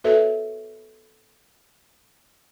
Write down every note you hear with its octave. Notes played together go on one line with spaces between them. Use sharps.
B3 F#4 A4 B4 C#5 E5